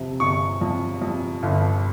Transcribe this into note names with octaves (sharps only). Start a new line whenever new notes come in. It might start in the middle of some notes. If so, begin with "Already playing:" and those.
Already playing: F2 C3
G1 C#6
F2
F2
G1